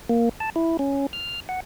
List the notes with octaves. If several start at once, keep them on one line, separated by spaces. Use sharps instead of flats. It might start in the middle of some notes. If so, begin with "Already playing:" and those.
A#3
A5
E4
C#4
F6
F#5